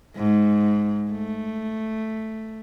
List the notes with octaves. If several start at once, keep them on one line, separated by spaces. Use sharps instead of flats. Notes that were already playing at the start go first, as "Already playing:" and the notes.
G#2
A3